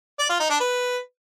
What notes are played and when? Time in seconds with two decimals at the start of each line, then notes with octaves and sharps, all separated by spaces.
0.19 D5
0.30 F4
0.40 D#4
0.50 D4
0.60 B4